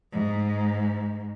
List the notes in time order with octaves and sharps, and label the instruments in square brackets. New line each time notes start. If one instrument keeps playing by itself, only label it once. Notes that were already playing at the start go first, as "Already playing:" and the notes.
[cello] G#2